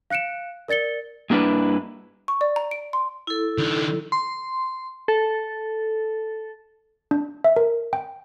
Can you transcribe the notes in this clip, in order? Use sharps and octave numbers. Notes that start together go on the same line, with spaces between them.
F5 F#6 C#7 D7 E7
A#4 D5 A6 C#7 G7
G2 A#3 D4 E4 B4
C#6
D5
A#5
D7
C6
E4 A4
D#3 D4
C6
A4
D4
E5
A#4
G5